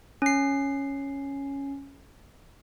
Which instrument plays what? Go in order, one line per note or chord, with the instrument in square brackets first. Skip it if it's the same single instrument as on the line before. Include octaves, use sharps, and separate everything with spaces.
[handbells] C#4 C7